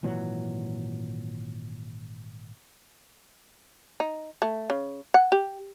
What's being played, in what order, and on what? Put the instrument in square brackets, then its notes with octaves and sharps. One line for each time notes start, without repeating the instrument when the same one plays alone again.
[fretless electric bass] G#1 A#2 E3 F#3
[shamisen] D#4
A3
C#3
F#5
G4